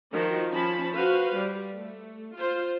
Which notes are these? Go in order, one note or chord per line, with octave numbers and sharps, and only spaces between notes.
D#3 F3 F#4
F3 C#4 A5 B5
F#4 B4 C5 F5
G3
A3
F4 C5